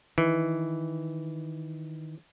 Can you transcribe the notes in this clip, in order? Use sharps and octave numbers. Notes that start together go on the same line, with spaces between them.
D#3 E3